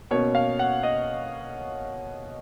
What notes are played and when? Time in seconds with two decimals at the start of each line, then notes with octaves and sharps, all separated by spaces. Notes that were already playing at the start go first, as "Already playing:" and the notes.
0.11 B2 A#3 C#4 C#5
0.35 F5
0.59 F#5
0.83 D#5